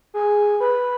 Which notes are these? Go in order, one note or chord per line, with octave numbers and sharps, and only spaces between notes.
G#4
B4